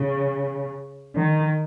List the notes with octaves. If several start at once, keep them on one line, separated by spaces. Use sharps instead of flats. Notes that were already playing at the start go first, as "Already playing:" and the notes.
Already playing: C#3
D#3